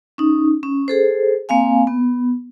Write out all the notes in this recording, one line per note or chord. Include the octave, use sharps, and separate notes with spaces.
C#4 D#4
C#4
G#4 A4 C5
A#3 C4 F5 G#5
B3